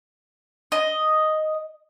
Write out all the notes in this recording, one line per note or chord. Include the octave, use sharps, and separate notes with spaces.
D#5